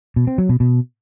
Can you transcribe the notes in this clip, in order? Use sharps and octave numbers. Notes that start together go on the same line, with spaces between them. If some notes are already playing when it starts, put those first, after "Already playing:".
B2
C4
F#3
B2
B2